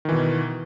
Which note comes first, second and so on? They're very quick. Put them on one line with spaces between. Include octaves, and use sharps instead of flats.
D#3 E3 B2